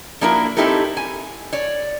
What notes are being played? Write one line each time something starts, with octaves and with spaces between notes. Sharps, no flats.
F3 A#3 D4 E4 F#4 A#4
C4 D#4 E4 G4 A4 A#4
G#5
C#5 D5